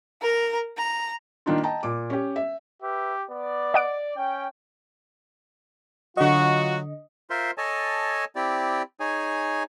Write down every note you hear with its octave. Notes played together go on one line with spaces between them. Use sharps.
A#4 A#5
A#5
D#3 A#3 D4 D#4 F4
D#5 G5 A5 A#5
A#2 D6
C#4 G4
E5
G4 B4 E5
B3 D5
D#5 F#5 D7
C#4 G5
D3 F#3 F4 F#4 D#5
F4 A#4 C5 E5 C6
A4 C#5 D#5 G#5 A5
C4 E4 G4 D5
D#4 G#4 C#5 G#5